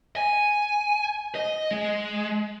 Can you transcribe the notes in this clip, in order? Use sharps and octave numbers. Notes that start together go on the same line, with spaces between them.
G#5
D#5
G#3